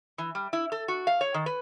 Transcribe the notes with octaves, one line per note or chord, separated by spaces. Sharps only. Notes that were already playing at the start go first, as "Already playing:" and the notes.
E3
G3
E4
A4
F#4
F5
C#5
D#3
B4